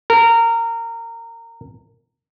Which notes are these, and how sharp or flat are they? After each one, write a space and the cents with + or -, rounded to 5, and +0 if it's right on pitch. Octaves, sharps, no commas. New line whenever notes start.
A#4 -20